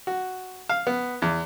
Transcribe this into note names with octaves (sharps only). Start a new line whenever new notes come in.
F#4
F5
B3
E2